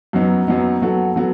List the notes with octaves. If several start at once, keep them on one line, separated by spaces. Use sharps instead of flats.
F#2 F#3 B3 D#4
F#2 F#3 B3 D#4
F#3 B3 F#4 A4
F#3 B3 F#4 A4